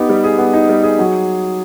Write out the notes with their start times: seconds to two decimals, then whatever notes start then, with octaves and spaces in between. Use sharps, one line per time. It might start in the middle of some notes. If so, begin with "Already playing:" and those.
Already playing: B3 D#4 G4
0.09 G3
0.24 G#4
0.38 B3
0.54 D#4
0.69 G3
0.83 G#4
0.99 F#3